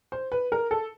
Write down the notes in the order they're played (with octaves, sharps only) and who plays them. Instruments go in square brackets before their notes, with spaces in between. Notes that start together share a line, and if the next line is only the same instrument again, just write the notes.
[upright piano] C5
B4
A#4
A4